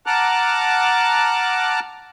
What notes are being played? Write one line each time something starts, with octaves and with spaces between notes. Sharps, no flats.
F#5 A5 A#5 D6 F6 F#6